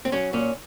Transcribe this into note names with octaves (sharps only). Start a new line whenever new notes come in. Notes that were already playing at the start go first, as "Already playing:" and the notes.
C4
F#3 C#4
A#2 C#4